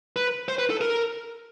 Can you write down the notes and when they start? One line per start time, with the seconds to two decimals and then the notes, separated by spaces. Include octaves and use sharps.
0.16 B4
0.48 C5
0.58 B4
0.70 A4
0.81 A#4